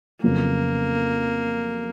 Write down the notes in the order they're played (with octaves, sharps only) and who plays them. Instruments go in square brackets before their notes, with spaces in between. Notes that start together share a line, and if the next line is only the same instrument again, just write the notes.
[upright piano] F2 C#3 F#3 B3 [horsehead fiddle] A#3